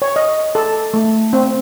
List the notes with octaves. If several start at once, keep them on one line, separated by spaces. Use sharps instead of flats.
C#5
D#5
A4
A3
C4